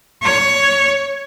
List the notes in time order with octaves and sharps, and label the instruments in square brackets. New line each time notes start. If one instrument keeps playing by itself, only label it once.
[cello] C#5